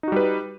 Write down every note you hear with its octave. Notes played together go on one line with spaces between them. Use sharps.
G3 D#4 F#4 B4